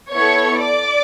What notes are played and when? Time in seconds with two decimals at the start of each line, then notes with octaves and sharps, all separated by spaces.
0.13 B3 E4 A4 C#5 C#6
0.64 D5 D6